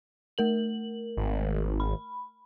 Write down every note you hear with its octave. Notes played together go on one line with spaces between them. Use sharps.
A3 A#4 F#7
G#1
B5